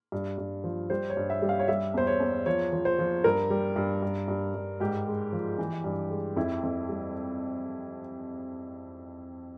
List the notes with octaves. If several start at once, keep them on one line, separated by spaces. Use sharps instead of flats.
G2
G2
F3
G3 C5
C#5
G2
E5
G3
F5
C#5
G3 E5
E2 C5
C#5
E2
F3 C#5
F3
C5
F3
G2 A#4
G3
G2
G2
G2
G2
G#2 G4
G#3
F3
E3
G2
G#3
F2 E4
F2
G3